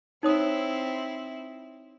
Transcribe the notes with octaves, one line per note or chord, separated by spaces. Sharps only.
C4 D#4 E4 C#5 D#6